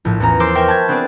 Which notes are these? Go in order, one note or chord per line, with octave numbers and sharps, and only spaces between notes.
A#1 A2
E2 C#4 A#5
A#4 C5 C6 D6 E6
A#4 E5 G5 C#6 F6
A5 B5 G6 G#6
B3 C4 D4 G#4 B4 D5